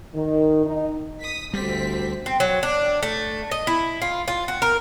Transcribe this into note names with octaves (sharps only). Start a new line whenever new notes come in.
D#3
D#4
D#6 B6
D2 G3 C4 B6
C4
F#3
D4
A3
D#5
E4
F4
F4
F#4
A#4